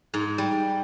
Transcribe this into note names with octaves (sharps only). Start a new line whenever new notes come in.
G#2
G3